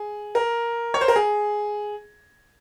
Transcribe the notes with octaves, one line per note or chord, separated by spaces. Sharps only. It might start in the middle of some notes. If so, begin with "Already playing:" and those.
Already playing: G#4
A#4
C#5
C5
A#4
G#4